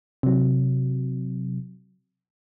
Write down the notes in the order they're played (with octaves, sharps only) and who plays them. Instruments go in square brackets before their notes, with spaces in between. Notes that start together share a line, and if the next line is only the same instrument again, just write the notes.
[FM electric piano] C3 F#3